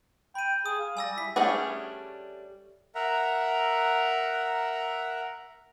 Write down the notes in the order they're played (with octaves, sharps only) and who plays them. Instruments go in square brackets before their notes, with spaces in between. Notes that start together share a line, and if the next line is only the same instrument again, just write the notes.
[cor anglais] G5 [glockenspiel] B5 D#7
[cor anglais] G#4 [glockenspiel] D#6
[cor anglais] F5
[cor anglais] G3 [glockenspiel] G#5 E6 A#6
[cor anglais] E4 [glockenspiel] B6
[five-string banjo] G3 A3 C#4 D4 G#4
[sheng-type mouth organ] A#4 E5 F#5 A#5